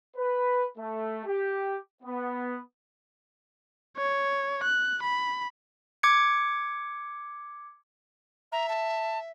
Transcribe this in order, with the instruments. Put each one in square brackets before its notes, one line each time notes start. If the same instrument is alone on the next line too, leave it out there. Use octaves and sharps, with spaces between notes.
[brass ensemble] B4
A3
G4
B3
[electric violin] C#5
F#6
B5
[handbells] D6 G#6 C#7
[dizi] E5 [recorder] A#5
[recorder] A5